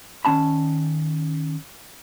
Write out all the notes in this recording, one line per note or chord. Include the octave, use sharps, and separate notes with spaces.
D#3 C#4 A5 B5